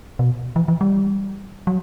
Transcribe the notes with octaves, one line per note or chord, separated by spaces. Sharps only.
B2
E3
E3
G3
F#3